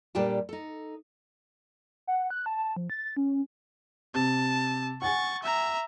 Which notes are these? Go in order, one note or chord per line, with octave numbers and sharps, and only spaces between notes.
A#2 G3 D4 G4 A4 A5
D#4 A4
F#5
F#6
A5
F3
A6
C#4
C3 A5
F#5 G#5 C#6 A6
E5 A#5